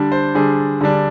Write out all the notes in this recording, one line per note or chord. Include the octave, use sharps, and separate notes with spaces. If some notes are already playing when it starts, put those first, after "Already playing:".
Already playing: D3 G3 D4
C5
D3 G3 D4 G#4
D3 G3 D4